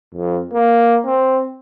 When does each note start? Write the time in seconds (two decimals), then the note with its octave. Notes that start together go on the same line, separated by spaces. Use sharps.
0.15 F2
0.54 A#3
1.05 C4